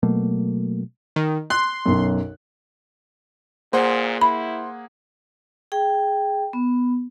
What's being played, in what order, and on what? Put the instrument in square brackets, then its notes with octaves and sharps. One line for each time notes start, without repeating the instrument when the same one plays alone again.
[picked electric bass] B2 F#3 A3 A#3
[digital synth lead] D#3
[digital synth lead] C6 [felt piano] F#6
[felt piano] B1 F#2
[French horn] A#2 [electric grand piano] A#3 G#4 F#5 [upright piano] C5
[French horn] E4 [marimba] B5
[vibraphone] G#4 G5
B3